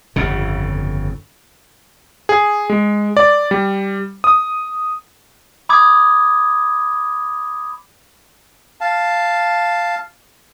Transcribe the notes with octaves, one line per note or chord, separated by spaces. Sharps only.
G1 F2 C#3
G#4
G#3
D5
G3
D#6
B5 D6 D#6 G#6
F5 A5